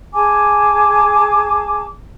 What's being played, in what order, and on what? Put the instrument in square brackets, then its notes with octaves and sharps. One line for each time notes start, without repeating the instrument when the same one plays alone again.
[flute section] G#4 G#5 A5 D6